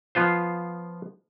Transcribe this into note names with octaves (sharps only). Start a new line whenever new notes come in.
F3 B3 F4 C5